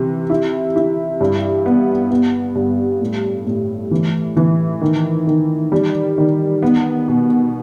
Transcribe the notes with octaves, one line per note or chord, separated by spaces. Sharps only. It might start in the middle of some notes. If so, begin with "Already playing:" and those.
Already playing: C3 E3
E4
E4
G2
B3
B3
G2
A2
A2
E3
E3
D#3
D#3
G3
D#3
B3
B2